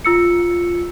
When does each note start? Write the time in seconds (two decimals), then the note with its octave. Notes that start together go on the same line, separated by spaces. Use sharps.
0.04 F4 E6 C#7